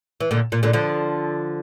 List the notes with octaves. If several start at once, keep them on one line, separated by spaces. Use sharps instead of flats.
E3
A#2 D3
A#2
A#2 D3
D3 F3